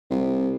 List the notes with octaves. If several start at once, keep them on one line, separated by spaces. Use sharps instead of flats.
C2